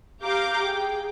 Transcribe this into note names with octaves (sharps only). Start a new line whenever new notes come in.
G4 F5 A#5 D6 G6
G#4 G5